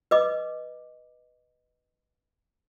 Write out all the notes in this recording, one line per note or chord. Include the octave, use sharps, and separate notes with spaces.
B4 D#5 D6